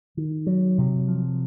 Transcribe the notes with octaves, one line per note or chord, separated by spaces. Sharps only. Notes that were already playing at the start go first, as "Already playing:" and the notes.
D#3
F#3
C3
F3